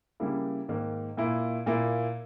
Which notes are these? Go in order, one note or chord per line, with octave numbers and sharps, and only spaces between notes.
C#3 G3 A#3 E4
G#2 D#3 A#3
A#2 A#3 E4
A#2 A#3 E4